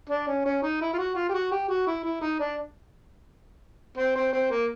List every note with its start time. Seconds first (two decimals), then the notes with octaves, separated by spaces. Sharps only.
0.10 D4
0.27 C#4
0.45 C#4
0.63 D#4
0.81 E4
0.93 F4
0.98 F#4
1.15 F4
1.29 G4
1.34 F#4
1.51 G4
1.69 F#4
1.87 E4
2.04 E4
2.21 D#4
2.39 D4
3.97 C4
4.16 C4
4.33 C4
4.51 A#3